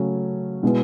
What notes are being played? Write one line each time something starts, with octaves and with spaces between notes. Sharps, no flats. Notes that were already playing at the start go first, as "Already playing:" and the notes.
Already playing: C#3 F#3 A3 C#4
B2 G#3 B3 E4 B4